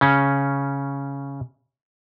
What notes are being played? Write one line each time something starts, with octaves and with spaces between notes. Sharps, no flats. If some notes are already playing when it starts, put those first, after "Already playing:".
C#3 C#4